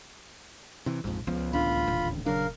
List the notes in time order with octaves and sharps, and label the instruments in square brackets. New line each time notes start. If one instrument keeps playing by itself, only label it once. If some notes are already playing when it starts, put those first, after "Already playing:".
[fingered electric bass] C3 E3
[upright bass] A#1 [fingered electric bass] F2 G#2
[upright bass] C#2 B3 [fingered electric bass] F3
[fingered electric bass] D1 A1 D4 [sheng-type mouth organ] F4 B5
[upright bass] D#1
[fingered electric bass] C#3 F#3 D4 [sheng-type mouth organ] A#4 F5